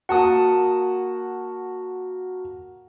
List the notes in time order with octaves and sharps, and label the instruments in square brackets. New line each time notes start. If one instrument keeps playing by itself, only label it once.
[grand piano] A#3 F#4 [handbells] F#5 A5 D#6